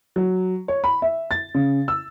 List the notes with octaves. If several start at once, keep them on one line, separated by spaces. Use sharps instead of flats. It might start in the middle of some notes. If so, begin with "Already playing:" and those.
F#3
C#5
B5
E5
A6
C#3
E6